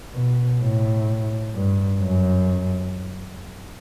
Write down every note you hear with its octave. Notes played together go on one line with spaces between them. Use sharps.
B2
A2
G2
F#2